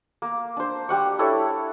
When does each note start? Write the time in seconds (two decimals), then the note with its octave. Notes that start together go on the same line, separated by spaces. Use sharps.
0.22 A#3
0.57 D4 C5
0.89 G3 F#5 C#6
1.19 D4 E4 A4 C#5